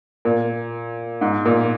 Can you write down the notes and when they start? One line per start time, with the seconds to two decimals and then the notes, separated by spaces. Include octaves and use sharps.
0.25 A#2
1.21 G#2
1.45 A#2